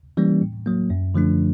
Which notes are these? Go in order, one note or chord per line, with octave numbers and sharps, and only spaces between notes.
E3 G3 A#3 C#4
A2
F#3 A#3
F#2
D3 F3 A3 D4